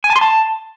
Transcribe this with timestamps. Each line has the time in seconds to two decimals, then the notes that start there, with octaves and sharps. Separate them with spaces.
0.04 G#5
0.10 A5
0.16 C6
0.21 A5